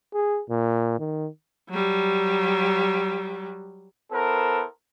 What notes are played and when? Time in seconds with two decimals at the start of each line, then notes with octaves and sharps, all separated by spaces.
0.14 G#4
0.50 A#2
0.99 D#3
1.70 F#3 G3
4.12 B3 E4 A4 A#4 C5